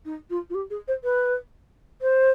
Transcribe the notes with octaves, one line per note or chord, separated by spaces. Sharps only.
D#4
F4
F4
G4
G#4
C5
B4
C5